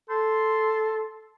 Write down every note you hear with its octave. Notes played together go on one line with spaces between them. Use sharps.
A4 C6